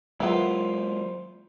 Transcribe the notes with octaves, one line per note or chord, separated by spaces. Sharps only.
E3 F#3 G#3 A#3 B3 E4 F4 C5